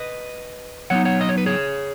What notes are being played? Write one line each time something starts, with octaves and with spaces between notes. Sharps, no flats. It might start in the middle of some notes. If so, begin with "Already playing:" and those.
Already playing: B4 D#5
F#3 B3 D#4 C#5 F#5
C#5 F#5
D#5
C#5
B4
G#4 C#5